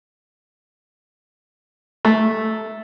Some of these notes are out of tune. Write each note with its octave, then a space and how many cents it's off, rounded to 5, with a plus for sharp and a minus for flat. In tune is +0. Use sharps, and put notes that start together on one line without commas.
A3 -5